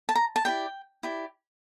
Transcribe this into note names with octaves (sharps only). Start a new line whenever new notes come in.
A5
A#5
A5
E4 G4 D5 G5
E4 G4 D5